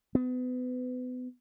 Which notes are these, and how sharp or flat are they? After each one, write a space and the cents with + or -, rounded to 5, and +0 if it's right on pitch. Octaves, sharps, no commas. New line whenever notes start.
B3 +30